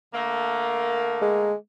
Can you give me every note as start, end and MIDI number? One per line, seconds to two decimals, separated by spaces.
0.12 1.51 50
0.12 1.51 57
0.12 1.51 58
1.22 1.54 56